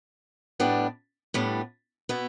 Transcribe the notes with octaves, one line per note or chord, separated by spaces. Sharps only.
A2 G3 B3 D4
A2 G3 B3 D4
B2 B3 E4